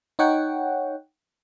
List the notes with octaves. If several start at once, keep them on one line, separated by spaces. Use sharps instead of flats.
D#4 C#5 F#5 G5